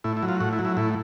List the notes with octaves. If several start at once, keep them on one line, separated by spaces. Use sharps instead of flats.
A2 E4
E4
F#3
F4
A2 F#4
E4
F#3
E4
A2 E4